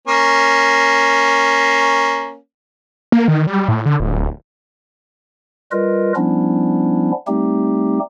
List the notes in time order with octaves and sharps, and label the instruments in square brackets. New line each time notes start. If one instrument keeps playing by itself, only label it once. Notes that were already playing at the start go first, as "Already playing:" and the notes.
[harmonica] A#3 C#4
[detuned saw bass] A#3
D#3
G3
A2
D3
D1
[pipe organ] G3 F4 A#4 B4 D#5
F3 G3 B3 C#4 D4 E4
G3 A3 C4 D#4 G4